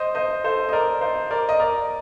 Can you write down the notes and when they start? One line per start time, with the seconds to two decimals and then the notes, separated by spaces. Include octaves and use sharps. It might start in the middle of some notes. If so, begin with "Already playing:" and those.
Already playing: C5 D#5
0.15 C5 D#5
0.44 A4 C5
0.69 D#5
0.72 A#4 D5
1.01 C5 D#5
1.31 A#4 D5
1.49 D#5
1.60 A#4 D5